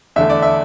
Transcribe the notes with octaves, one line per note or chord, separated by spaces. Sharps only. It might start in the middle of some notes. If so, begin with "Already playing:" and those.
E2 D3 A3 E5
D5
E5